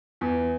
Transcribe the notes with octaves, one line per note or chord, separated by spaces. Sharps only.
E2